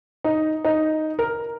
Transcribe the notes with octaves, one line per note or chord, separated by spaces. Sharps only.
D#4
D#4
A#4